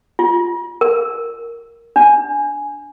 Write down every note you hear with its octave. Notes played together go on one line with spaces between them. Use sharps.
F4
A#4
D4